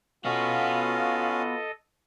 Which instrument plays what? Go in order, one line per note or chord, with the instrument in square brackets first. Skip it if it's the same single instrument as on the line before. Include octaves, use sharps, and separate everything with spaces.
[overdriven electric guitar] B3 F#4 [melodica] C#4 F5 [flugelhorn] F4 [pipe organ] A4 D#5